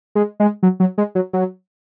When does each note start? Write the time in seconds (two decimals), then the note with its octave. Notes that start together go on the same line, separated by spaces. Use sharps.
0.15 G#3
0.40 G#3
0.63 F#3
0.80 F#3
0.98 G#3
1.15 F#3
1.33 F#3